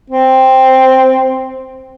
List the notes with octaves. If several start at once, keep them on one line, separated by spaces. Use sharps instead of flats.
C4